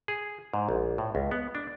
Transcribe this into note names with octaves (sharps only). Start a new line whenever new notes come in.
G#4
G#2
A#1
A2
C#2
B3
D4